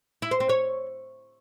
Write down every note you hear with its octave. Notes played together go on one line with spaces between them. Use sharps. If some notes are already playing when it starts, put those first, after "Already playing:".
E4
C5
C4
C#5